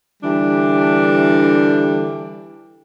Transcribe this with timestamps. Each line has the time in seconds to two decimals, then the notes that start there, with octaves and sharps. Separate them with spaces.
0.23 D3 E3 G3 D4